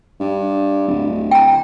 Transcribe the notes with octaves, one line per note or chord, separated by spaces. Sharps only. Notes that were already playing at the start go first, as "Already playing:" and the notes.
G2
D1
G5 A#5